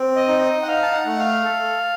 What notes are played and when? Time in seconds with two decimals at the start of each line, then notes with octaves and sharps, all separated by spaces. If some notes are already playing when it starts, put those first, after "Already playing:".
Already playing: C4
0.16 D#5
0.28 D#4
0.41 D#5
0.62 F#5
0.67 D#4 F5
0.82 A5
0.93 F#5
1.06 A3
1.19 F5
1.44 A4